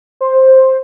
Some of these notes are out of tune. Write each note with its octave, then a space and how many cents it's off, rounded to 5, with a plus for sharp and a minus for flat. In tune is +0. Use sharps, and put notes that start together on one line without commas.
C5 +10